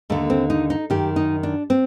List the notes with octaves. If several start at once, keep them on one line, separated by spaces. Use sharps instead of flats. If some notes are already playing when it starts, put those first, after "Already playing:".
D#2 D3 A3
C4
D#4
D#4
F#2 D#3 G4
D#4
D4
C4